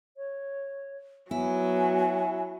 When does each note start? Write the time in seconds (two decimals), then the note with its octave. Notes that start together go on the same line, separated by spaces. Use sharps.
0.17 C#5
1.31 F#3 B3 E4 G#5